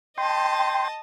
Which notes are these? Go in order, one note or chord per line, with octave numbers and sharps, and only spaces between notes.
D#5 G5 A5 C6